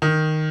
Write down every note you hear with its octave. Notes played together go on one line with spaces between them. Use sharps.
D#3